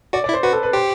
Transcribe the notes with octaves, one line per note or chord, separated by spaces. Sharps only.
F#4 D5
D5
E4
C5
F#4 B4
A4
B4
G4 C5